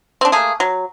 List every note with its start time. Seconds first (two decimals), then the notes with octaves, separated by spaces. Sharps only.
0.21 C4 D4
0.32 A3 A#3 G#4
0.60 F#3